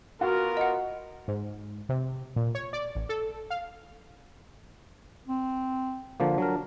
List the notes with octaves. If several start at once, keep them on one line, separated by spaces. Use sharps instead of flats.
B3 F4 F#4 A#4
D#5 F#5
G#2
C3
A#2
C#5
D5
A1
A4
F5
C4
D3 F3 A#3
F#3 D4 A#4